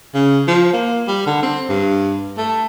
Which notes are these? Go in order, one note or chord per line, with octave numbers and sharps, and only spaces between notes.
C#3
F3
A#3
G3
D3
C4
G2
A3